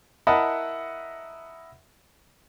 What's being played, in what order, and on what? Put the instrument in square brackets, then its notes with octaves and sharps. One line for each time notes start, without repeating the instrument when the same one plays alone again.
[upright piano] E4 A#4 D#5 F#5 A5 B5